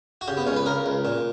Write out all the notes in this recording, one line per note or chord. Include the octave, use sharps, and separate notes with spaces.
F#4
C#3 G4
B3
C#2 C#4
B4
C#3 A#4
C#2
A#2